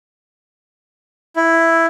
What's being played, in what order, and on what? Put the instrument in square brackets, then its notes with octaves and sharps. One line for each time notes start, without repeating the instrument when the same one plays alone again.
[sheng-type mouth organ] E4